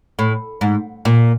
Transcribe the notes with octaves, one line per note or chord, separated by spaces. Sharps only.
A2
G#2
A#2